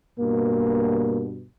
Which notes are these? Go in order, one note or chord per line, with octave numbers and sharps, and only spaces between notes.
G2 B2 A#3